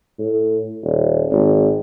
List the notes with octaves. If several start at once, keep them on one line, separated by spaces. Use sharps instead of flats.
A2
D#1
G#1